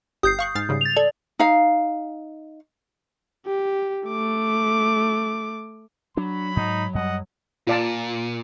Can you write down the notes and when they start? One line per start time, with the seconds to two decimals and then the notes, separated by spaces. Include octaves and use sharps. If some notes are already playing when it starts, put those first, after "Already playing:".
0.23 G1 G4 D#6 G6 C7
0.39 F5 C#6 F#6
0.55 G#2 F6 A6
0.69 G#2 C#3 G3
0.81 A6 F7
0.96 A4 D5 G#6
1.39 D#4 F5
3.46 G4
4.07 A3 D6
6.17 F#3 D4 B5
6.57 G#2 D#4
6.95 F#2 G3 D#5 F#5
7.67 A#2 F4 D5 A5